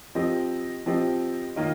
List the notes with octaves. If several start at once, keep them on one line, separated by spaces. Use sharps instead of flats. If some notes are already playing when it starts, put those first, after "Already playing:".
F3 C4 G4 D#5
F3 C4 G4 D#5
D#3 A#3 F4 A#4 D#5